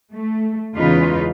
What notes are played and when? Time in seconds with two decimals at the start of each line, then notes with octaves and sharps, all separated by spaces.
0.13 A3
0.75 E2 C#3 G#3 D#4 F4 B4